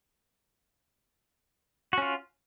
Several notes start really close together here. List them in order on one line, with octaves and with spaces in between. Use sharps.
F#4 C#4 F4